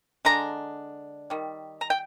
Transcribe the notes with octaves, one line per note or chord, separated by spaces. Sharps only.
D3 G#3 D4 A#5
D#3 G3
A#5
G5